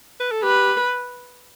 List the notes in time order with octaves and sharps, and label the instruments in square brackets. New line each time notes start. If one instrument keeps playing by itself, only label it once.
[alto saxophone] B4
A4
[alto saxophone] G4 [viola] B4